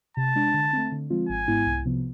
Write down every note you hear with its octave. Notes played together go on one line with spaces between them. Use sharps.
C3 A5
G#3 D4
D3
A3 C4
D3
F3 G#3 C4 F4
G#1 G#5
G#2 G#3 B3 E4
C2
C3 F3 B3